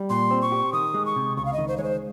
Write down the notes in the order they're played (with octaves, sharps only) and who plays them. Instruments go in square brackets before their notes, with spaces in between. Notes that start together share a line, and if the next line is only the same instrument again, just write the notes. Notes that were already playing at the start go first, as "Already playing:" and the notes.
Already playing: [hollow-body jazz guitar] G3
[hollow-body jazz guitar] A#2 [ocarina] C6
[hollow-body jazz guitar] C4
[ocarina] C#6
[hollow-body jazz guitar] G4
[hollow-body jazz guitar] D#3 [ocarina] D#6
[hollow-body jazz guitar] G#3
[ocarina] C#6
[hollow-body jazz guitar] C3
[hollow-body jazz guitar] C#2 [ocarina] C#6
[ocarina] F5
D#5
[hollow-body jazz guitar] D#3
[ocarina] C5
[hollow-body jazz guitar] G#3 [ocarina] C#5
[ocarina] C5